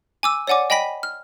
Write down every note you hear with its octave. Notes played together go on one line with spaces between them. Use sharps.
G#5 D6 E6
C#5 D5 F#5 G#5 D6
D#5 G5 G#5 B5 A#6 B6
F6